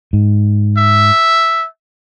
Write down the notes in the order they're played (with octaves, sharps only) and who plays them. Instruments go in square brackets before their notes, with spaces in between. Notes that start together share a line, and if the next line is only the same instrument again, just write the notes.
[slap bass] G#2
[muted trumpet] E5